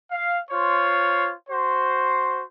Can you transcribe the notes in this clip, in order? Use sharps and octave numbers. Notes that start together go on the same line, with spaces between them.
F5
F4 C5 C#5
F#4 C5